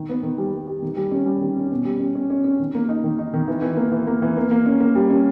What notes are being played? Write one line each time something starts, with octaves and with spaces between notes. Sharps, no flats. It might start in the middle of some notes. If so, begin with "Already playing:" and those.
Already playing: D#3
B3
D#3
G3
G3
G4
D#3
G3
C#4
G3
D#3
C#4
B2
G3
C#4
C#4
C#4
C#4
D#3
A#3
D#4
D#3
D#4
D#3
E3
E3
A#3
E3
A#3
E3
A#3
A#3
C#4
A#3
G3
C#4